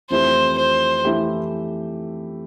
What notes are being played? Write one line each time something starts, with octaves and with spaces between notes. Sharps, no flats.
F2 E3 A3 E4 G4 C5
C5
E3 A3 E4 G4